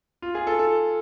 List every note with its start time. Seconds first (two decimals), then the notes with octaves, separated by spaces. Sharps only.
0.22 F4
0.35 G#4
0.47 A4
0.59 A4